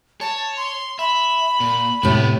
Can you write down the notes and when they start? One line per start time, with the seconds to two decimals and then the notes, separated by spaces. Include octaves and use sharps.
0.21 C#5 A5
0.57 C6
0.99 E5 B5
1.60 A#2
2.03 A2 C3 A3 B3